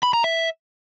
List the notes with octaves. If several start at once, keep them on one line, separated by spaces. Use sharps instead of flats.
B5
A#5
E5